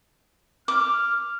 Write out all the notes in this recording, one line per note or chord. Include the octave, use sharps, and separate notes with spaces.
D6 F6